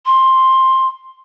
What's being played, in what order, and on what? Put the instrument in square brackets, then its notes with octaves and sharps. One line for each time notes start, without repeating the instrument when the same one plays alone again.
[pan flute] C6